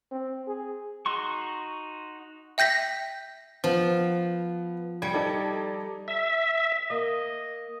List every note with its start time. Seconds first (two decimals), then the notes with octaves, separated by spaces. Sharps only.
0.11 C4
0.48 G#4
1.06 D#4 F#4 C6 C#6
2.58 E5 G5 G6 A#6 B6
3.64 F3 B3
5.02 G3 G#6 C#7
5.14 D#4 A4 D5
6.08 E5
6.90 A#3 D#5